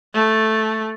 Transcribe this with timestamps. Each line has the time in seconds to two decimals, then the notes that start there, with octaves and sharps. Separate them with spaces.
0.14 A3